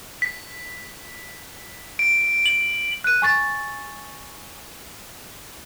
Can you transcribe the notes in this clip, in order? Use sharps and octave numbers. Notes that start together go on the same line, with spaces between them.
B6
D7
F#7
F#6 D#7
G#5 C#6 A6